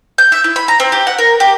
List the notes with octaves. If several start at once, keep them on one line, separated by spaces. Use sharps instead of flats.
G6
E5
E4
B5
A#5
C4
G4
F#5
A#4
G4